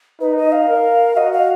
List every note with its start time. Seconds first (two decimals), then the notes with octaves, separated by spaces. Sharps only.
0.21 D#4 B4
0.37 D#5
0.52 F5
0.68 A#4
1.16 F#4 D#5
1.33 F5